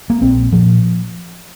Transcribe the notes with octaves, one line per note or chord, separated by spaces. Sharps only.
A#3
A#1 C4
A#2 F3